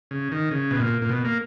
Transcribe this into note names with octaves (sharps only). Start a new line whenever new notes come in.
C#3
D#3
C#3
B2
A#2
A#2
B2
A#3